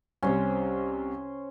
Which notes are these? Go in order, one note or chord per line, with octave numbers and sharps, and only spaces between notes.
C2 C3 C#4 C5